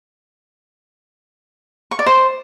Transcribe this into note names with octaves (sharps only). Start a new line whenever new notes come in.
C#6
D5
C5